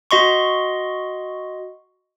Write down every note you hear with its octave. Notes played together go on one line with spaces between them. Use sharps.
F#4 D#5 C6 C#6